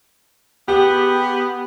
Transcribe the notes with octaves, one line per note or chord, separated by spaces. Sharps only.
B3 G4 G#4